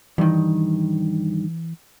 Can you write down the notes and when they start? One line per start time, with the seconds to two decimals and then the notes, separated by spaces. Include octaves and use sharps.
0.18 G2 D#3 E3